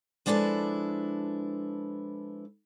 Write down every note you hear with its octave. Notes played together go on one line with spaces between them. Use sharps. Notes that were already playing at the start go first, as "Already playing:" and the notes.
F3 G#3 D4 E4 A4 B4